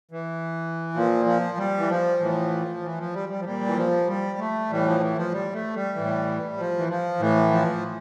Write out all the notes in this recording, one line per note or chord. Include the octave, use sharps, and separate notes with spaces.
E3
A#2 F3
F3
G3
E3
F3
A2 E3
E3
F3
G3
G3
F3
A#2 G3
E3
F3
G3
A3
A2 E3 G3
F3
E3
F3
G3
A3
G3
A2 E3
F3
E3
F3
A2 E3
F3